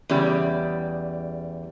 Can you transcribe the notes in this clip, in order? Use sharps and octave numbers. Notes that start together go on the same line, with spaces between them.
E2 C#3 G3